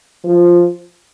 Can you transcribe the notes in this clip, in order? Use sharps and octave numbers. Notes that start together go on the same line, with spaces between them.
F3